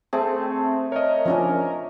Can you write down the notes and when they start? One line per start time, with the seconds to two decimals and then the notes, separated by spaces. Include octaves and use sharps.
0.13 A3 C4 G#4
0.92 A#4 C#5 D#5
1.25 F3 C#4 D4